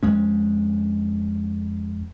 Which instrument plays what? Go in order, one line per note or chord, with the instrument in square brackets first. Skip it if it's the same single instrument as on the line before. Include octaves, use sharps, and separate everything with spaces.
[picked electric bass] F2 G#3 C#4